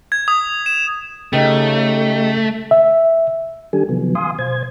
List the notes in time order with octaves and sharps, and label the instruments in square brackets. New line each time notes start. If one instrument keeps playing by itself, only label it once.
[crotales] G#6
D#6
E7
[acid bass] C#3 [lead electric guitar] A3 [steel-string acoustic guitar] D#4 G4
[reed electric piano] E5
[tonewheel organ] D#3 G3 D4 G4 A4 G#5
C3 D#3 F3 F#3 B3
F5 G#5 C6 D#6
B2 C5 G#6